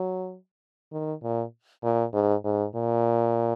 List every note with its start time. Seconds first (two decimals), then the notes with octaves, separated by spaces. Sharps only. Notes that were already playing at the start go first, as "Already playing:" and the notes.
Already playing: F#3
0.92 D#3
1.23 A#2
1.83 A#2
2.14 G#2
2.45 G#2
2.75 A#2